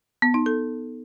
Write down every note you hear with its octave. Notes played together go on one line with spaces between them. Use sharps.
B3
D#4
A4